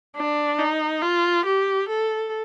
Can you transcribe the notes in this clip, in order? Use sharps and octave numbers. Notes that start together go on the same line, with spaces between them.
D4
D#4
F4
G4
A4